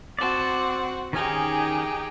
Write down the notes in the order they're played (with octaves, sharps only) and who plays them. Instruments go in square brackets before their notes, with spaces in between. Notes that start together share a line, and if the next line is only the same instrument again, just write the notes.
[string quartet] C4 F#4 F#5 [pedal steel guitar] D5 A5
[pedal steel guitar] D#3 C#4 A#5 [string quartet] D#4 G4 G#4